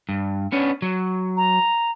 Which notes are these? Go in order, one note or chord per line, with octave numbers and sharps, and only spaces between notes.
G2
B3 C#4 D4
F#3
A#5